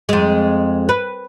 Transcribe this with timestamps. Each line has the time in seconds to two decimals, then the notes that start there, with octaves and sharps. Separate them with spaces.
0.09 F2 G#3
0.89 B4